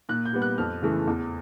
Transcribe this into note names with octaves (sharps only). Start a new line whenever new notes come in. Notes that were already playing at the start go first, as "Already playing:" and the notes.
A#2 F#6
G6
G3 B3
F#6
F2 F6
C#3 E3 A3
E2